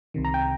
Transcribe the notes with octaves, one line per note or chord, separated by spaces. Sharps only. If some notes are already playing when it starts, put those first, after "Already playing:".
C2 C3 D#3
A#5
G5